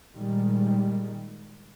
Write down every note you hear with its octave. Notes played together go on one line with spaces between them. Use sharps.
A#2 D#3 G3 G#3